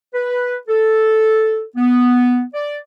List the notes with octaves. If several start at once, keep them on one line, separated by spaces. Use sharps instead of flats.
B4
A4
B3
D5